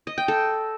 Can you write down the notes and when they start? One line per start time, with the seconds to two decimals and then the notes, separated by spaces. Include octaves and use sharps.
0.07 D#5
0.18 G5
0.28 A4